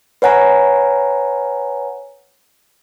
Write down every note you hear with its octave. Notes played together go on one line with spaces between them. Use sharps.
B4 C#5 F#5 G#5 A#5